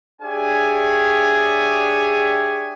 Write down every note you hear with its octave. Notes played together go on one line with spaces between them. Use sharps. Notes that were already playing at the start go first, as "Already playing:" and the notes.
D4 G4 G#4 C#5 E5 G#5